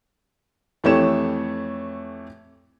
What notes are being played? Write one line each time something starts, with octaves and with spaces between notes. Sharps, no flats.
F2 E3 A3 G4 C#5 E7